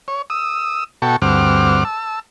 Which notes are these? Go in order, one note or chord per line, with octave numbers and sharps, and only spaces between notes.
C#5
D#6 E6
B2 F#4 A4 G5 A5 C#6
D2 G2 C4 F#5 D6 F6
A5 E6